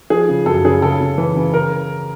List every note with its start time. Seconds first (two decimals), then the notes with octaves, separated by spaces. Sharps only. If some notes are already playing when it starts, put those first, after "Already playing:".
0.10 F3 G#4
0.29 C#3
0.46 F#2 A4
0.64 C#3 G#4
0.82 C#3 A4
1.01 C#3
1.18 E3
1.36 C#3
1.54 A#4